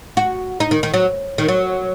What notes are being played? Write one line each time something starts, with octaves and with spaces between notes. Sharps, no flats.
F#4
D#4
D#3
D#3
F#3
D#3
F#3